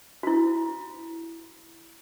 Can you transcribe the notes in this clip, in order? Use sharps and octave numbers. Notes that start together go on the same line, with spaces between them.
E4 F#4